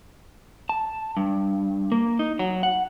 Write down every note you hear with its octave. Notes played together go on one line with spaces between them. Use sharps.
A5
G2
A#3
D#4
F#3
F#5